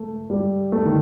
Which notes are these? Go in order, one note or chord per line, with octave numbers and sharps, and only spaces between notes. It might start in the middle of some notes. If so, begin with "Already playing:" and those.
Already playing: A3
G3
A3
D#3